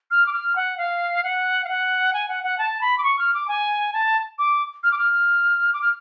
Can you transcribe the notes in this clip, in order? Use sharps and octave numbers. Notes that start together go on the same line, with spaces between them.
F6
D6
F6
F#5
F5
F#5
F5
F#5
G#5
F#5
F#5
A5
B5
D6
C#6
F6
D6
G#5
A5
D6
F6
D6
F6
D6
F6